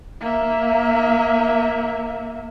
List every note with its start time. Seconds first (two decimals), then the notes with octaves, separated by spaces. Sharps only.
0.20 A#3 E5